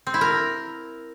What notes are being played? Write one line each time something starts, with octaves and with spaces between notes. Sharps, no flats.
C4
E4
A#4